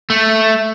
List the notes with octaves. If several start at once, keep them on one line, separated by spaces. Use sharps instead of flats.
A3